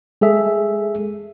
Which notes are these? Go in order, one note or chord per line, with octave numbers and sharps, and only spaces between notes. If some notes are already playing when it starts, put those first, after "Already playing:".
G#3 G#4 A4 E5